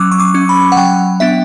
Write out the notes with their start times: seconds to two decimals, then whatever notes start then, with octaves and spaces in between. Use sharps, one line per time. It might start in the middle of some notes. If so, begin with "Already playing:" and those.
Already playing: F#3 C#4 D6 E6
0.11 C#6
0.20 D6
0.34 C#4
0.49 B5
0.72 F#5
0.77 F#3 G5
1.20 B3 D4 E5